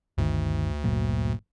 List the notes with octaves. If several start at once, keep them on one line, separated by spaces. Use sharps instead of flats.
G1 D2 D3 D#3
G1 A#2 F#3